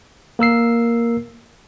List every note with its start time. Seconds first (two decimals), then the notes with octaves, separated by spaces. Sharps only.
0.39 A#3 A#4 E6 C7